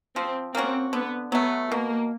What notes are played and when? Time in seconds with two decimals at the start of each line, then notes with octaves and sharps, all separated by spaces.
0.16 F3 C4
0.55 A#3 C4 C#4 F#4
0.93 D3 B3
1.32 F#3 A3 B3
1.71 B2 A#3